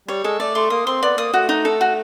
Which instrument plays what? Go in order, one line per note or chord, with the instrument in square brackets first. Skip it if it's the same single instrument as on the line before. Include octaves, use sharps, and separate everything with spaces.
[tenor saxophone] G3 [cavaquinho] C#5
[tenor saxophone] G#3 [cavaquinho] A4
[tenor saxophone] A3 [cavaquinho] D5
[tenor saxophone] A3 [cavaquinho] C6
[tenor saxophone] A#3 [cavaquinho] D#6
[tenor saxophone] C4 [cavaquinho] C6
[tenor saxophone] B3 [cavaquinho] D5
[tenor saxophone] A#3 [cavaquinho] D#6
[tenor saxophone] A3 [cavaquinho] F#4
[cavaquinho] D#4
A4
F#4